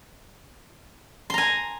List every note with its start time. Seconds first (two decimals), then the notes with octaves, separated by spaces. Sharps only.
1.30 C6
1.34 A#5
1.38 G#5